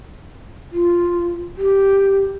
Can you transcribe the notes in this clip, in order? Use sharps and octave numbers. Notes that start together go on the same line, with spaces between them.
F4
G4